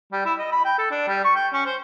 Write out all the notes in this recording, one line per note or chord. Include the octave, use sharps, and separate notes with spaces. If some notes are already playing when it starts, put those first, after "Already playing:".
G3
E4
D#5
B5
G5
A4
D4
G3
C#6
G5
C#4
C5